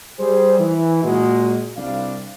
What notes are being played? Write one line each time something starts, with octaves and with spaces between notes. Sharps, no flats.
G3 G#4 C5
E3
A#2 G#3 F#4
C2 G3 D4 F5